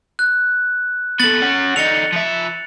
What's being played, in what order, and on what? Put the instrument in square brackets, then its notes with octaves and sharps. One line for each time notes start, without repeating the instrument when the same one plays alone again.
[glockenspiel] F#6
[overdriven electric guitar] B3 A4 [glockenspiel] A6 F#7
[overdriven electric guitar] C#4 F#5
[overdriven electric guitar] D3 D#4 [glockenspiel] A6 C#7 F7
[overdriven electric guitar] F3 E5